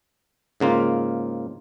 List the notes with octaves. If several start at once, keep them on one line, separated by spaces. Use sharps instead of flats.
G#2 C#3 A#3 F4